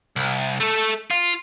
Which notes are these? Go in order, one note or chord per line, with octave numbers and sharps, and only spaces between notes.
C2
A3 A4
F4